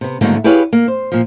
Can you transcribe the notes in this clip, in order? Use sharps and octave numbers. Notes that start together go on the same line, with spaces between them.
C3 B3
G#2 D3 D#3 F#3 A3 A#3
E4 G4 G#4 B4 C#5 F5
A#3
C5
A#2 F3